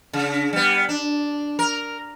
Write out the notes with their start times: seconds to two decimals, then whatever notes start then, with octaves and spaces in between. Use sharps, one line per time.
0.13 C#3
0.53 G3 B3
0.89 D4
1.59 A#4